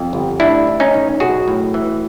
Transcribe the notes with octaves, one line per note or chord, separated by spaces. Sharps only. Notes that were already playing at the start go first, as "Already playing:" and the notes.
Already playing: F2
G1
A2 D4 E4
E3
C#4 D#4
B1
B1 F#4 G#4
A2
E3